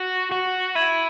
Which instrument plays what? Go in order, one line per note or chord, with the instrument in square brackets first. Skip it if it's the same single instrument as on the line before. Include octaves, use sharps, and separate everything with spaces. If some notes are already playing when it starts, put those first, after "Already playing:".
Already playing: [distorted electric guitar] F#4
F#4
[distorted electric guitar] E4 [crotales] G#6 D#7 F#7